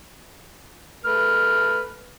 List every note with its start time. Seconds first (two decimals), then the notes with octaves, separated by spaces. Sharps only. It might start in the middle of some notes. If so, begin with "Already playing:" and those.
1.05 A3 B4 F6